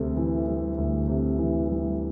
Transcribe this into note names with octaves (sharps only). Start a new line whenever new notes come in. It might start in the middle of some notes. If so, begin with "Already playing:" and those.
Already playing: D2 C3 G3 A4
E3
G3
D2
C3
E3
G3